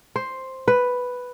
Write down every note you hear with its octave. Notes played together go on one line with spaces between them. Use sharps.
C5
B4